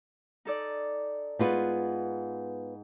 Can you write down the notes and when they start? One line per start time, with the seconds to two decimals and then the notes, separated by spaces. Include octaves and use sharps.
0.45 D#4 A4 D5
1.39 G#2 B3 F4 G#4 B4 F#5